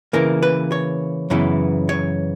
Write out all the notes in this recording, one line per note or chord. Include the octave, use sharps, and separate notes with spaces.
C#3 E3 A#3 A#4
B4
C#5
F#2 C#3 E3 B3
C#5